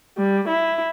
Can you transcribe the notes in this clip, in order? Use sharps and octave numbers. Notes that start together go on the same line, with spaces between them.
G3
E4